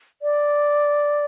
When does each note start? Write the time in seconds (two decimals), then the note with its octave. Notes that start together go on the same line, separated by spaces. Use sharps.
0.22 D5